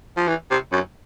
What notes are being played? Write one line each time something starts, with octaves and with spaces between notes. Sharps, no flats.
F3
E3
C3
F#2